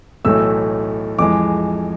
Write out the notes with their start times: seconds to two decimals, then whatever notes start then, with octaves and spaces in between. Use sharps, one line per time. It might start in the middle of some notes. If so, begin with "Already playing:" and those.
0.25 B1 A2 E3 A3 E6
1.19 F2 E3 G#3 D6